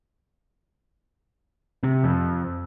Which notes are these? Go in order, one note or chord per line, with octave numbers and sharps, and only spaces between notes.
C3
F2